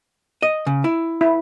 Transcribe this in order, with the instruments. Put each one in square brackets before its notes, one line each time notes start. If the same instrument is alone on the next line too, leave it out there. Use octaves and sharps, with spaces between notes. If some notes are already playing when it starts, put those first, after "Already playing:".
[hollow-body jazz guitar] D#5
C#3
E4
[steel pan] E4